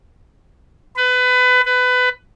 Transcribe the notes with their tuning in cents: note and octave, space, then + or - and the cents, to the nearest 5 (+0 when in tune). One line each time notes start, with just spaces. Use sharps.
B4 +25
B4 +20